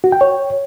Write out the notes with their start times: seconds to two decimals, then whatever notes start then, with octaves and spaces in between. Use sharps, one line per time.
0.04 F#4
0.12 G5
0.21 C#5